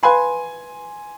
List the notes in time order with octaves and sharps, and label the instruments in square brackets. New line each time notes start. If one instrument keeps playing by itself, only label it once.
[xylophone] B4 F5 B5 [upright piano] G#5 C6